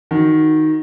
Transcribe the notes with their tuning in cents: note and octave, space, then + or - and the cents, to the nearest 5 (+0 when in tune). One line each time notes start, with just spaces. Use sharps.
D#3 +0 F#4 +0